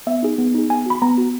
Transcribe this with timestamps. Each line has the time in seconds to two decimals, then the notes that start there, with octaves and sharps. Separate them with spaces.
0.07 B3 E5
0.23 D#4 G#4
0.38 B3
0.54 D#4 G#4
0.70 B3 G#5
0.86 F#4 B5
1.02 B3 A#5
1.18 F#4